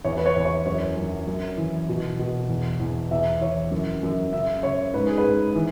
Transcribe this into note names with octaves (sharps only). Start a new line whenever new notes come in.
E2 C#5
B4
C#5
E2
C#5
F#2 C#5
F#2
F#2
E3
B2
B2
E2
E2
E2 E5
E3 C#5
F#2
F#2
C#3 E5
C#3 C#5
G#2 B4
G#4
B4
G#2
E3